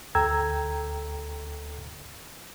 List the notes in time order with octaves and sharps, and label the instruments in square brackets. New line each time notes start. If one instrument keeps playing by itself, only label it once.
[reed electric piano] D2 A4 G5 A#5 E6 G#6